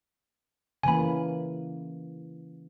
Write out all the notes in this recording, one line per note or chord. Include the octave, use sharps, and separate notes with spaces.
C#3 E3 A#3 G#5 B5